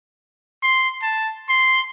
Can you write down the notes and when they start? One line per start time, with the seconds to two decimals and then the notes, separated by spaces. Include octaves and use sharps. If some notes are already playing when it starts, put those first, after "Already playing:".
0.63 C6
1.02 A5
1.49 C6